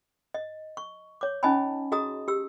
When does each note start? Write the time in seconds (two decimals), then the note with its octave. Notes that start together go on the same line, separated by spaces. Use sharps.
0.34 D#5
0.77 C#6
1.21 C#5 D6
1.43 C#4 D#4 D#5 G#5 A5 B5
1.92 F#4 G#4 D#5 A#5 D#6
2.28 G4 E6